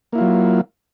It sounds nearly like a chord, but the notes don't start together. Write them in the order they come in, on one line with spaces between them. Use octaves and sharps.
A#3 E4 F4 F#3